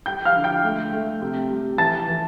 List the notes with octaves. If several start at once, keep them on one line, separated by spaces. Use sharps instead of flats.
G3 G5 G6
F5 F6
D3
G5 G6
A3
A3
C3
G3
E3 A5 A6
E3